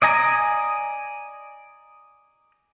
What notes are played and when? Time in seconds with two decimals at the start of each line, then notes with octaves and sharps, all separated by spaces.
0.02 D5 D#5 G#5 A#5